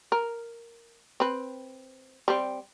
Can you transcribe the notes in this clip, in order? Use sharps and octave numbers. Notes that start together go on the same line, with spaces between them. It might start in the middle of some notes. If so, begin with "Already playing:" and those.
A#4
C4 B4
G3 C4